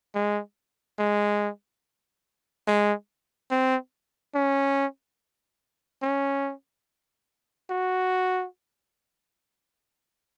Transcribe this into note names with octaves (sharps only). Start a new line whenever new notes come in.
G#3
G#3
G#3
C4
C#4
C#4
F#4